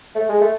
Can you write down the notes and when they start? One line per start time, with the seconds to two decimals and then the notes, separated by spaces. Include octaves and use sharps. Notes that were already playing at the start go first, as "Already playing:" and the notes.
0.15 A3
0.29 G#3
0.41 A3